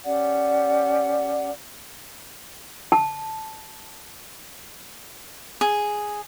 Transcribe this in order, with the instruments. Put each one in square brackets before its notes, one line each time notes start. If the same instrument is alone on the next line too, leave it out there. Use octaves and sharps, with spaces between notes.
[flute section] C#4 G4 D5 F#5
[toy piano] A5
[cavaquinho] G#4